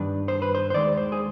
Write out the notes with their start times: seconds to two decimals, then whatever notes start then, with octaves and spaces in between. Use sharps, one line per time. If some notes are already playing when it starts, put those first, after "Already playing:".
Already playing: G2 D#3 G3 D4 B4
0.28 C5
0.42 B4
0.55 C5
0.70 C5
0.74 D#2 D#3 G#3 D5
0.97 C5
1.12 G#4